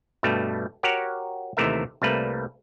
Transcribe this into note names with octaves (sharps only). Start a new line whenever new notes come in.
G2 B2 G3 A3
F#4 G4 A#4 C#5 F#5
D#2 C3 E3 A3 A#4 E5
C2 G3 A3 A#3 B4